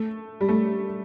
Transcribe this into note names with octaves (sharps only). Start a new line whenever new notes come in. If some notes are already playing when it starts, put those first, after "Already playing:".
Already playing: A3
G3
A3